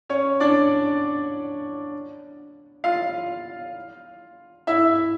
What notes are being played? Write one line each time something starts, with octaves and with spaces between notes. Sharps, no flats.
C#4 C#5
D4 D5
F4 F5
E4 E5